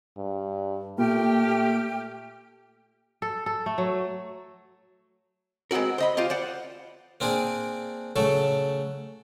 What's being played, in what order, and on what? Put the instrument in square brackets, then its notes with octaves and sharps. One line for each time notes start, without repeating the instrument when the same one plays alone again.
[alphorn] G2
[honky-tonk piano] A#2 [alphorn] A3 [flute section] G4 G5 F6
[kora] A4
A4
A3
F#3
[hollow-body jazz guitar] G#3 B3 C4 F#4 A#4
C5 D#5 B5
F4 G4 C5 F5
C5 D5 F#5
[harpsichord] A#3 C4 D4 G#4
C#3 F#3 A3 A4